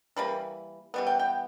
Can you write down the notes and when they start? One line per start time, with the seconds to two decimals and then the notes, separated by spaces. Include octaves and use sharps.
0.16 E3 G3 A#3 B5
0.94 E3 G3 B3
1.07 G5
1.19 G5